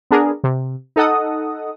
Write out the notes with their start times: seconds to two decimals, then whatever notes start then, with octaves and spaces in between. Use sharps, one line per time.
0.11 B3 D4 G#4 A#4
0.44 C3
0.96 D#4 A4 D#5 F#5 D#6